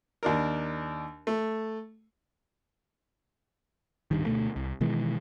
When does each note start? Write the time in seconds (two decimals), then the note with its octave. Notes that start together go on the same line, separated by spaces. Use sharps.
0.23 D#2 D4 A#4
1.27 A3
4.11 D1 G2 D#3
4.26 D2 B2 A3
4.56 C2
4.81 B2 D#3 E3 G#3